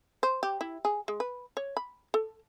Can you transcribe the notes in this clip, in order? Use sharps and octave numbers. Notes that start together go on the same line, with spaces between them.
C5
G4
E4
G#4
G#3
B4
C#5
B5
A4